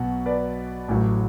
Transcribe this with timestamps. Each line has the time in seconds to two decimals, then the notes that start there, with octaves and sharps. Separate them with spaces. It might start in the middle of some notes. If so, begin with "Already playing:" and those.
Already playing: B1 B2 F#3 F#5
0.26 B4 D5
0.88 A1 A2 F#3